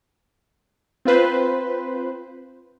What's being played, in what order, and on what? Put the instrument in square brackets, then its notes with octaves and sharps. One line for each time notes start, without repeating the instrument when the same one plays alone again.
[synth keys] C4 F4 B4 C5